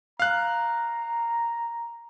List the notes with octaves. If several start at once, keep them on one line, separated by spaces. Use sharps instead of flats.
F5 A#5 F#6